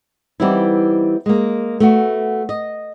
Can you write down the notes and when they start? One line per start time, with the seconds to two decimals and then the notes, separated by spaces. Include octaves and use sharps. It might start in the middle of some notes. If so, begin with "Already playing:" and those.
0.40 E3 G3 B3 C4 D#4 E4
1.26 G#3 A#3
1.80 A3 B3 F#4
2.49 D#5